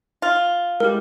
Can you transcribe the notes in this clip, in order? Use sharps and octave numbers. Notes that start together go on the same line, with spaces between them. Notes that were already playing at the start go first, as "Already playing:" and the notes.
F4
G#3 E4 G4 A#4